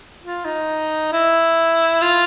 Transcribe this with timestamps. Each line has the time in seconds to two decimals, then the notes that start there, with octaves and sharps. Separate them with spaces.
0.23 F4
0.45 D#4
1.12 E4
2.02 F4